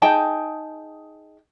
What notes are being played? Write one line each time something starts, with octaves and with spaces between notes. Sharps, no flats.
D#4 G#4 G5 A5